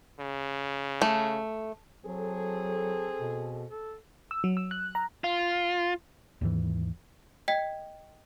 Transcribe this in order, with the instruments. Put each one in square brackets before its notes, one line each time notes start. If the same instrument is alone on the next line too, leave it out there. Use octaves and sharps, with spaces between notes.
[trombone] C#3
[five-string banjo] A3
[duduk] F#3 [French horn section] C4 G#4 A4
[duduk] B2
A4
[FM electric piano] E6
F#3
E6
F#6
A#5
[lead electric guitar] F4
[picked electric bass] D#2 G#2 E3
[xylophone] D#5 G5 G#6 B6